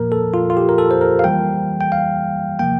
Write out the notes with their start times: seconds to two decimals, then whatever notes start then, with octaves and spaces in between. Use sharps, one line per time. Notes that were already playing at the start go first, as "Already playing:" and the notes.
Already playing: A#2 F3 A#3 A#4
0.12 A4
0.34 F4
0.50 F4
0.57 G4
0.69 A#4
0.78 A4
0.91 C5
1.01 A#4
1.19 F5
1.24 E3 G3 A#3 G5
1.81 G5
1.92 F5
2.59 C3 F3 A#3 G5